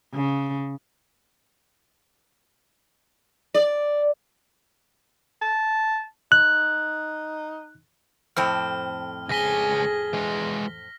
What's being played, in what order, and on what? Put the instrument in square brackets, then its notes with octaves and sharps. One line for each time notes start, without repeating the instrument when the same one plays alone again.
[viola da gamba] C#3
[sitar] D5
[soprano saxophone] A5
[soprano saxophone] D#4 [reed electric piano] F#6
[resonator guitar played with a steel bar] F2 A2 C4 [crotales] F6
[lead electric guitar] C#2 G#5 [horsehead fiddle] G#4 [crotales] A#6 B6 G7
[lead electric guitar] E3 G#3